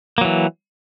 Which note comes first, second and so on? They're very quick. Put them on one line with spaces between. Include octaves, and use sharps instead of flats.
A#3 F#3 E3